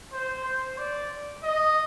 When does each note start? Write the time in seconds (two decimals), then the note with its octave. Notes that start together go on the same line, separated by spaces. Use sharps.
0.13 C5
0.45 C5
0.78 D5
1.43 D#5